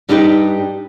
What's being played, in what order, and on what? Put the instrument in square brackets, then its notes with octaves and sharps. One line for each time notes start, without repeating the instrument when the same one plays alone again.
[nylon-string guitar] G2 G3 D4 D#4 F4 G4